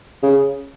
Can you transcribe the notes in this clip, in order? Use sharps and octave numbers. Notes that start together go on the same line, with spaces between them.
C#3